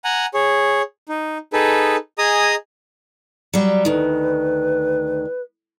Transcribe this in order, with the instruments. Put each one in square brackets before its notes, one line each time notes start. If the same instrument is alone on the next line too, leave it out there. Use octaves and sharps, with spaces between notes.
[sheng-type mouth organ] F#5 G#5 A#5
G#4 C#5
D#4
D#4 G#4 A4 B4
G#4 D#5 G#5 A#5 D#6
[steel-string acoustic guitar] F#3 G3
[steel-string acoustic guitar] D2 D#3 [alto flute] B4